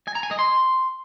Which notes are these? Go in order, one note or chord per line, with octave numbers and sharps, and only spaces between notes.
G#5
A#5
G#5
D#5
C6